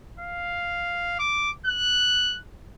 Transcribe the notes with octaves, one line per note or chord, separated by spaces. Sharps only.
F5
D6
F#6